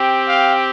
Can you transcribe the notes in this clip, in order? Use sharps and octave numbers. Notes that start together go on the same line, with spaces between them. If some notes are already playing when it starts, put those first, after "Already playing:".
Already playing: C4 G4
F5